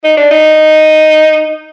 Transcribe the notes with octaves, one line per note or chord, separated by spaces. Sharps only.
D#4
D4
D#4